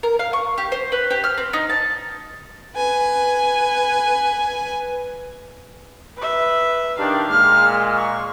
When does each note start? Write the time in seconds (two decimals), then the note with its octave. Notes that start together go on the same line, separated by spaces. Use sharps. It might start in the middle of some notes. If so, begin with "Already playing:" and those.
0.03 A#4
0.19 F5
0.33 C#6
0.58 G4
0.72 C5
0.92 B4
1.11 G4
1.24 F6
1.38 C4
1.53 D#4
1.69 A5
2.75 B4 G#5
6.17 B4 E5
6.98 D#3 D4 G4 F5
7.29 A#2 G#3 F6
7.97 C#6